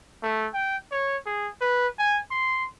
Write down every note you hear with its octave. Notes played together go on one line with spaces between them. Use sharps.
A3
G5
C#5
G#4
B4
G#5
C6